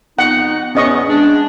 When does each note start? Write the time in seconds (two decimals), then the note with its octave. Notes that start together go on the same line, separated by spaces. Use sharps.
0.19 F2 B3 D#4 F#5
0.75 E2 A2 B3 C#4 D#5 C#6
1.08 G#3 D4